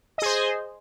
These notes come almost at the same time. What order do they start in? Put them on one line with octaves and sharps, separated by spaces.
D#5 G#4 C5